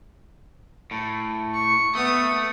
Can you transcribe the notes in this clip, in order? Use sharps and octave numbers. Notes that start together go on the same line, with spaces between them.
A2
C#6
A3 B3 D#6